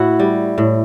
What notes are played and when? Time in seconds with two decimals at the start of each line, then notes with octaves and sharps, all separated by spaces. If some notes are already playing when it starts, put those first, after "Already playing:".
Already playing: A2 E4 F#4
0.20 G3
0.58 A2